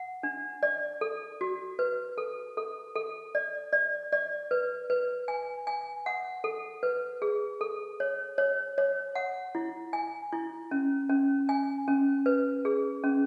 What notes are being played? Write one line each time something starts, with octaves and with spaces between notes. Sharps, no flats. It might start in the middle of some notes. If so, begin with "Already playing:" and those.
Already playing: F#5
D4
D5
A4
F#4
B4
A4
A4
A4
D5
D5
D5
B4
B4
G#5
G#5
F#5
A4
B4
G#4
A4
C#5
C#5
C#5
F#5
E4
G#5
E4
C#4
C#4
G#5
C#4
B4
G#4
C#4